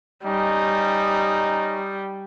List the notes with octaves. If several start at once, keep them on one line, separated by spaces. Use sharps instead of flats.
G3 C#4 D#4